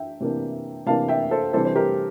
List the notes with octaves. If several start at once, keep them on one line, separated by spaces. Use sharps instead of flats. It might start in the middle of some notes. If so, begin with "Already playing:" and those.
Already playing: E3 D4 E5 G5
C3 E3 A#3 D4
C3 E3 A#3 D4 F5 A5
E5 G5
A4 C5
C3 E3 G3 D4 A4 C5
C5
G4 A#4